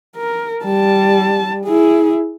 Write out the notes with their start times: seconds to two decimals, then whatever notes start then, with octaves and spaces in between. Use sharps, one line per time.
0.16 A#4
0.64 G3 A5
1.65 E4 G#4